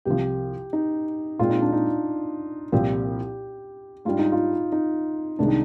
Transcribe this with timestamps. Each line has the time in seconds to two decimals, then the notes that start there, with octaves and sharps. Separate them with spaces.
0.05 C2 C3 F3 G4
0.73 D#4
1.39 A#2 G#3 C4 F4
1.50 D#4
1.61 D4
1.73 D#4
2.72 C2 A#2 F3 C4 G4
4.05 G#2 G3 D4 F4
4.19 D#4
4.32 F4
4.72 D#4
5.39 C2 C3 D#3 G#3 D4
5.48 D#4